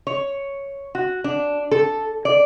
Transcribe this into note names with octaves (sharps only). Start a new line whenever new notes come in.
C#5
F#4
D4
A4
D5